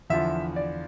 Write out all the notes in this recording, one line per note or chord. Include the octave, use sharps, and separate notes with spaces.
E2 D3 F3 E5
D5